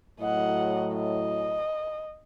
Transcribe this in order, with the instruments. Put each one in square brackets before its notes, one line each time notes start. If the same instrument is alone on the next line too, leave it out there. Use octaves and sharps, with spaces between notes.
[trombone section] A2 F#3 [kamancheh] D#5 F#5
[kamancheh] D#5